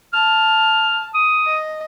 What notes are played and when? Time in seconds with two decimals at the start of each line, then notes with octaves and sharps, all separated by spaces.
0.13 A5 F6
1.14 D#6
1.46 D#5